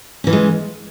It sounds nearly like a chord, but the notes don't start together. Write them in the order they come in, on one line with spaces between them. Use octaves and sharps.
C#4 E3 F4 G#3